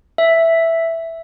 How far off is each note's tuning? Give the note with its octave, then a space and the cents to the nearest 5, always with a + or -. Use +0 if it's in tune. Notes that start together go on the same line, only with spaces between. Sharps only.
E5 +0